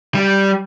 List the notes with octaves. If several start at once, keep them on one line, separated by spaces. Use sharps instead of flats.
G3